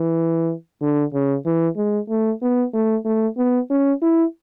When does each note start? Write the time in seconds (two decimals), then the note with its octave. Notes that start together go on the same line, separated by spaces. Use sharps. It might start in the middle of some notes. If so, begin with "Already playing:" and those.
Already playing: E3
0.82 D3
1.14 C#3
1.46 E3
1.77 G#3
2.09 A3
2.42 B3
2.74 A3
3.05 A3
3.37 B3
3.71 C#4
4.02 E4